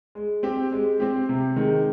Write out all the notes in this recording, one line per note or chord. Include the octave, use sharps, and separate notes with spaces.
G#3
C4 G4
G#3
C4 G4
C3
D#3 G#3